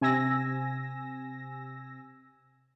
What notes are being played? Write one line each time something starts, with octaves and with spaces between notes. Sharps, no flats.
C3 G#5 E6 A#6